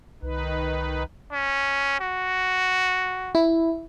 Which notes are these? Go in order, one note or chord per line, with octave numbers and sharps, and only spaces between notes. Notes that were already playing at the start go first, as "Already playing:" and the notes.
C2 D#3 D#4 B4
C#4
F#4
E4